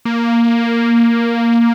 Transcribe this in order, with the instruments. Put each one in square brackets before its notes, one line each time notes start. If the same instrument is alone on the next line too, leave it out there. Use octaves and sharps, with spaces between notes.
[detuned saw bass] A#3